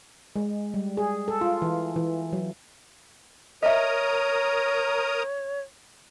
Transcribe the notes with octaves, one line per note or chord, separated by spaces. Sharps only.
G#3
G3
G#4
A4
F4
E3
E3
F#3
A#4 C#5 D#5 E5 A#5 D#6